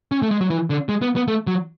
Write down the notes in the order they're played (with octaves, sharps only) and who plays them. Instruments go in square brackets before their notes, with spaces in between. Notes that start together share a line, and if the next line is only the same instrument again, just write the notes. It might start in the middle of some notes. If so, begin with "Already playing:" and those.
[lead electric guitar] C#4
A3
G#3
F#3
E3
D3
G#3
B3
B3
A3
F#3